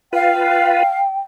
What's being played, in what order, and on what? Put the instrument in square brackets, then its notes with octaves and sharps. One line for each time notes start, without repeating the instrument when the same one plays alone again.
[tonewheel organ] F4 B4 [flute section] F5 [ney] G5